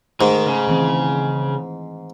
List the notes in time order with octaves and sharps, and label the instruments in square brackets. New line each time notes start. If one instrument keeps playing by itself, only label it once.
[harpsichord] G#2 [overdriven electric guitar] D#3 [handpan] A3
[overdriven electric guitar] C#3
[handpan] D#3 E3 C4